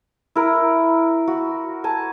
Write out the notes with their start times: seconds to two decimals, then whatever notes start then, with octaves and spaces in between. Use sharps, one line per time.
0.36 E4 A#4
1.28 F#4
1.84 A#4 G#5 A5